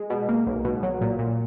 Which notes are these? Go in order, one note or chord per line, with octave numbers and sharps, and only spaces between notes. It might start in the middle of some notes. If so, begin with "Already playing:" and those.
Already playing: G#3
B2
A#3
B1
B2
F#3
A#2
A#2